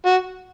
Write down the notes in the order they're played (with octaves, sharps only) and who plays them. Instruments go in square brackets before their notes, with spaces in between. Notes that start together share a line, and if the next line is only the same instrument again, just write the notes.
[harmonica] F#4